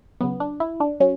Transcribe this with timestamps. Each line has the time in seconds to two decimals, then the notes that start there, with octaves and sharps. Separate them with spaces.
0.21 C#3 F#3 B3
0.40 D4
0.60 E4
0.80 D4
1.00 F#3 C#4